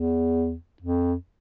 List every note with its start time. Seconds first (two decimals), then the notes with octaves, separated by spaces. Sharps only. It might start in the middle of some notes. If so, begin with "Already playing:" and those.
Already playing: E2
0.82 F2